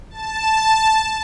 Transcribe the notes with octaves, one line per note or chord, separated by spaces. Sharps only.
A5